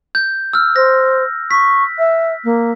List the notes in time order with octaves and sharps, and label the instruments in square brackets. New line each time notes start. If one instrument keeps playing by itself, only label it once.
[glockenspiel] G6
E6 F6
[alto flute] C5 [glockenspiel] A#6
[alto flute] C#6 [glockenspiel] B6
[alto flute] E5
A#3